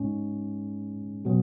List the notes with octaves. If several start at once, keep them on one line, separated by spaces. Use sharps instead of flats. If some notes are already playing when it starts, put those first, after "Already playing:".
Already playing: G#2 G#3 C#4
B2 F#3